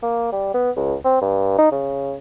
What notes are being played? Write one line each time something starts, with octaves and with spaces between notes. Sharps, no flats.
A#3
G3
B3
C#2
C4
G2
D#4
C#3